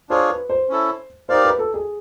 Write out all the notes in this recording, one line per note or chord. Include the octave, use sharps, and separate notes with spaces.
D4 F4 G#4 C5 C#5
B4
C5
C#4 E4 A4
D#4 G4 A#4 C5 D5 F5
B4
A4
G#4